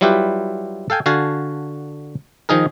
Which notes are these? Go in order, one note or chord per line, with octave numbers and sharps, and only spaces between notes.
F#3 G3 E4 F4 G4 B4
A4 F5 G5 G#5
D3 F#4 F5 G#5 A5
D#3 F3 D#4 G#4 A#4